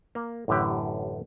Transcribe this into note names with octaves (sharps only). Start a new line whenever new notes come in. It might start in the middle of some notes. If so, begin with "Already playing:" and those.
A#3
A1 F#2 A2 D3 G4